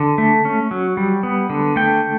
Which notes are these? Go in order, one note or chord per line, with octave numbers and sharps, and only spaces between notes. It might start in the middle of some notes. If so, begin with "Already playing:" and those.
Already playing: D3
A3
C#4
F#3
G3
B3
D3
A3 G5